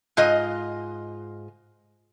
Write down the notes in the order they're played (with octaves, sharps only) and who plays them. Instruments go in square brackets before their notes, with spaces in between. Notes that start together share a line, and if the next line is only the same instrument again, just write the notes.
[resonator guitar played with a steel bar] G#2 F4 D#5